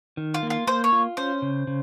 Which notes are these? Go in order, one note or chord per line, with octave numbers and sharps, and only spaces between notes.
D#3
F4
A#3
F4
A#3 C5
C#5
F4
C#4 C5
C#3
C#3